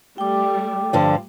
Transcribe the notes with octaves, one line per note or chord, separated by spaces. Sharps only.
G3 A3 G5 D6
G2 D3 F3